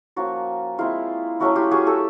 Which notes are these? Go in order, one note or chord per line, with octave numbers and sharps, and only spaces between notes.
F3 A#3 C#4 F4 F#4
G#3 C4 E4 F4
F#3 A3 C#4 E4 F#4
F4 G4
F#4 G#4
G4 A4